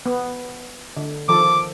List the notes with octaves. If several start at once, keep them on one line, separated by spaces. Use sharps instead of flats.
B3
D3
D#3 F3 A4 D6